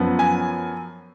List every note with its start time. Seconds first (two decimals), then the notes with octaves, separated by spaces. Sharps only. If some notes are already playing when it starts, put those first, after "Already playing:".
Already playing: F#2 F3 B3
0.19 G#5